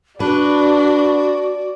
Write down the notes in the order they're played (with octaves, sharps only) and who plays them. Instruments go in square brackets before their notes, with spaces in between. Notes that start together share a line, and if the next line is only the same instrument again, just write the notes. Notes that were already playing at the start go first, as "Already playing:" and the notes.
[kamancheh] D4 [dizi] F#4 [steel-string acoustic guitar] B4 [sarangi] D5